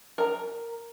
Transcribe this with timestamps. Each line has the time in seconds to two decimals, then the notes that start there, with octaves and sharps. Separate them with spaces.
0.18 A#4 A#5